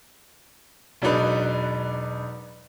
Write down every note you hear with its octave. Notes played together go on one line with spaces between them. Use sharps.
E1 F#3 D4 D#4 B4